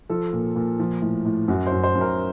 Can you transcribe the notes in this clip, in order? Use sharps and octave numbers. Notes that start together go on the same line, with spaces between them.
F3 A4
A#2
A#2
F3
A2
A2
F#2 F#4
C5
F#2
C5
F#2
A#4